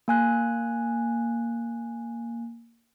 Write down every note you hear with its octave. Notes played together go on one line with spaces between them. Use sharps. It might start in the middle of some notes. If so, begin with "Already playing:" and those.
A#3 G#5 F#6